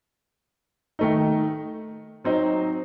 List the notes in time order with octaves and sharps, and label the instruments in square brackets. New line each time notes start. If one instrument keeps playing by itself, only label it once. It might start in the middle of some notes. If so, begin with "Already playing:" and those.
[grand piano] D#3 A3 D#4
F#3 C4 D#4